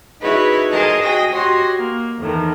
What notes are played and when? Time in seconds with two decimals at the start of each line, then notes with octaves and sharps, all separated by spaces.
0.21 D#4 E4 F#4 G#4 B4 C#5
0.70 G#4 A#4 C5 D#5 A5 A#5
1.03 F#4 G#4 D#5 G5 D#6 A#6
1.32 F#4 G4 C#5 D#5 F#5 C6
1.77 A#3
2.18 E2 A2 D#3